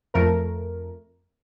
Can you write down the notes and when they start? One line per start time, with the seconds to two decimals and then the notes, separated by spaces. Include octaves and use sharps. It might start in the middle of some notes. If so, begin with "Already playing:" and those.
0.14 F2 A3 A#4